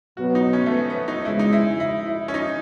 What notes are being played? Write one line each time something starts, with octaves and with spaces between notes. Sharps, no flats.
B2 F#3 B3 F#4
D#4
C#4
A3
B3
B3
D#4
E2 C#3 G#3 E4
D#4
E4
E4
E4
C#4
D#4